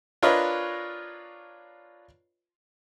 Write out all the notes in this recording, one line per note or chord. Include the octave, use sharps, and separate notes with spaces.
D4 F4 A#4 B4 C#5 D#5